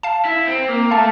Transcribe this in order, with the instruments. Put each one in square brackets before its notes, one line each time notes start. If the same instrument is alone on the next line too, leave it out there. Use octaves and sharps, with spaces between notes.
[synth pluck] F5 A5
[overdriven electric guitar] E4
C4
A#3
[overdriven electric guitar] A3 [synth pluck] F5 A5